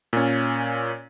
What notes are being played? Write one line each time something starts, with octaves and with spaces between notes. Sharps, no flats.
A#2 C#4